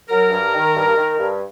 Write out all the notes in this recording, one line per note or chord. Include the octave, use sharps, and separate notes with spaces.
F#3 A#4
G2
D#3
G2
D#3
G2